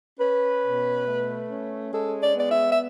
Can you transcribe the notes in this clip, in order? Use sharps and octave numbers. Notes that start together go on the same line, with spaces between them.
C#4 B4
B2
A3
C#4
G#3 A4
D5
B3 D5
E5
E5